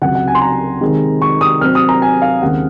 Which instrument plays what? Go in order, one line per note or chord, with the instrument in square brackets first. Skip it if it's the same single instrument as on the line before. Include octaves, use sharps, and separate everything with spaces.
[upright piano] C#2 C3 F#3 F#5
F#5
G#5
C6
A#5
C3 D#3 G#3 C4
C#6
D#6
C3 F#3 C4 F6
D#6
A#5
G#5
F5
D#2 C#3 G#3 C4 F#5